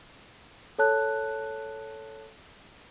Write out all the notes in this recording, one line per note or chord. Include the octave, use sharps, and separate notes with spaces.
A4 C#5 A5 F#6